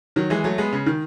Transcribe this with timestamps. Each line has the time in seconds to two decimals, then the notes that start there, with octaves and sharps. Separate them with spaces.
0.16 D#3 F#3
0.30 E3 G#3
0.44 F#3 A3
0.58 G#3 B3
0.73 C#3
0.86 D#3